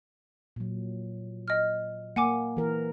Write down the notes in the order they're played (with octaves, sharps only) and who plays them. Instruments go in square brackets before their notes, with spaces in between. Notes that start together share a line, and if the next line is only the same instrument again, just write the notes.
[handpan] A#2 F#3
[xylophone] D#5 F6
[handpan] A#3 [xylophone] F#5 G#5 D6
[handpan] E3 A#4